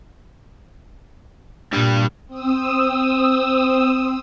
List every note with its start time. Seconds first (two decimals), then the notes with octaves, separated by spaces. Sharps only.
1.73 G2 A#2 G3
2.27 C4 D#6 E6